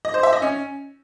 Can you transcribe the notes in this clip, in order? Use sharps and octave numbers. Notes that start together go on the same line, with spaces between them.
D#5
C5
E5
D#5
C#4